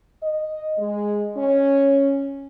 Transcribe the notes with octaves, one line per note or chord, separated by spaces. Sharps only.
D#5
G#3
C#4